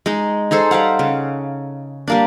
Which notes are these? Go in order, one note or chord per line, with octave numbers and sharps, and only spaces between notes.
G#3 D#4
D#4 G#4 A4 C5
G3 C5 F5 F#5
C#3
G3 A#3 D4